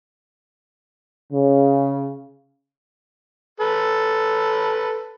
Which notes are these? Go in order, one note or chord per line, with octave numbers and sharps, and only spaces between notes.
C#3
A4 B4